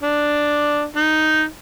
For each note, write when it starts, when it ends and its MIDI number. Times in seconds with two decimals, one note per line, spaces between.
0.02 0.84 62
0.96 1.44 63